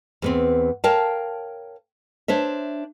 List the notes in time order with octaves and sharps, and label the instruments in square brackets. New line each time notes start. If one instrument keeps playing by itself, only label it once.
[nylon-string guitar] E2 B3 C4
A#4 C#5 F5 G5 A5
D4 C5 C#5 E5